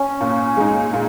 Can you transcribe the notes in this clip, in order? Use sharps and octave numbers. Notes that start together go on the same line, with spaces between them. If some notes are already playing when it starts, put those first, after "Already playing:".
Already playing: C#4
A#2
G#3 D#4
A#2